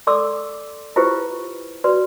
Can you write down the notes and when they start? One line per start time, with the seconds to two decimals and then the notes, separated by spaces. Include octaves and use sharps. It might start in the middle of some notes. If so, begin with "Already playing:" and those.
0.07 A4 D5 C6 D6 E6
0.96 E4 F4 G4 G#4 B4 C5
1.84 F#4 B4 D5 C6